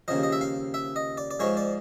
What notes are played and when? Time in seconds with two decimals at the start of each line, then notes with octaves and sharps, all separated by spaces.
0.08 D#2 C#3 F3 D#5
0.23 D#5
0.32 E5
0.41 F5
0.74 E5
0.96 D#5
1.17 D5
1.31 D5
1.40 G#2 F3 G#3 C#5
1.57 D5